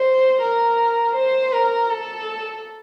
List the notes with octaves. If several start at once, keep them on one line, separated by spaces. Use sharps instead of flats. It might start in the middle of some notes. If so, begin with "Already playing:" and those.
Already playing: C5
A#4
C5
A#4
A4